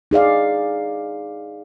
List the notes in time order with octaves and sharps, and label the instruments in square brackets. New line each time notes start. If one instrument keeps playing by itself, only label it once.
[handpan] D#4 G#4 D5 F5